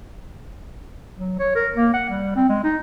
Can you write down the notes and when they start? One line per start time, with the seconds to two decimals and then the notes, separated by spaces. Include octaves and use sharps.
1.17 F#3
1.39 C#5
1.55 A#4
1.76 A#3
1.94 F#5
2.09 G3
2.36 C4
2.49 G#3
2.64 D#4